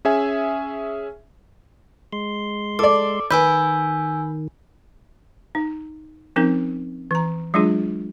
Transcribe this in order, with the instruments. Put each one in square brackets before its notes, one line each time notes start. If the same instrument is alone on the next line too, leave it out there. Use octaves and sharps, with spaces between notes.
[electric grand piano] C#4 G#4 E5 G#5
[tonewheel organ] G#3 C6
[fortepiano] A4 D5 [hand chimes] D6
[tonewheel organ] D#3 [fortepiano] B4 [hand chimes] G#5 E6 G6
[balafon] D#4
F3 C4 C#4 D#4 A#4
E3 A#5
F#3 G#3 D4 F4 G#4